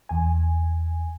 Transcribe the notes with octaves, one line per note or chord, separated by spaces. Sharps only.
E2 G#5